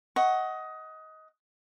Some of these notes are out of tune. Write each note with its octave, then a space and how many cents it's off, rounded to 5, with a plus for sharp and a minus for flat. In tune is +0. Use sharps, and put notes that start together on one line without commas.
D#5 +20 F#5 +10 C#6 +0